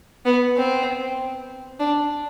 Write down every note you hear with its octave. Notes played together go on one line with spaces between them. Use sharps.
B3
C4
D4